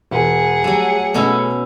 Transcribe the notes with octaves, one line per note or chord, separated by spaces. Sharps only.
E1 G#4 F#5
F#3 G3 A3
B2 A3 C#4 E4 D#5